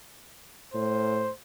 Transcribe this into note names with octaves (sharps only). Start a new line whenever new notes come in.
A2 C5